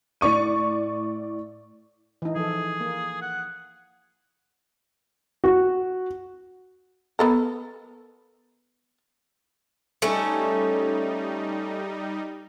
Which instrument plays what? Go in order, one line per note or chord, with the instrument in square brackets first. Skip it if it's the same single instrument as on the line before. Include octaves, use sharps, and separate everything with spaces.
[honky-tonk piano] A2 D5 C#6 D#7
[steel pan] E3 D#4
[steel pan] F3 A4 [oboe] G#4
[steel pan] A#3
[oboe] F#5
[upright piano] F#4
[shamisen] B3 A4 A#4
[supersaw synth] G3 D#4 [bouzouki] A3 C#4